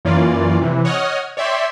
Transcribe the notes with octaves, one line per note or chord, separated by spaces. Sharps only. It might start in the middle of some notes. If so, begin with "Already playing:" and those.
F#2 E3 A#3 C#4 F4 D5
C3 E3
C#5 D#5 F#5 D#6 F6
C#5 D5 E5 G5 C6